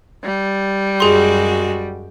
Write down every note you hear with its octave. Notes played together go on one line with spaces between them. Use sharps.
G3
F#2 G#3 F#4 G#4 C6